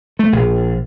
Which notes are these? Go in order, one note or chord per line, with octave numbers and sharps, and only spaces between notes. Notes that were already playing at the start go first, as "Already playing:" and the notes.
A3
A#1